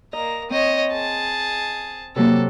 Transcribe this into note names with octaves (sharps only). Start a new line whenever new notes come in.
A#3 D#5 A#5
C4 C#5 D#5
G#4 A5
C3 F#3 A#3 A4